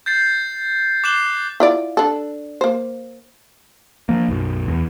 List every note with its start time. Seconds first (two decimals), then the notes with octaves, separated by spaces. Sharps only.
0.06 G6 A6 C7
1.04 D6 F#6 C7 E7 F#7 G7
1.60 E4 F4 D5
1.97 D4 A4
2.61 A#3 C5
4.09 F3 A#3
4.28 B1 F#2
4.68 E2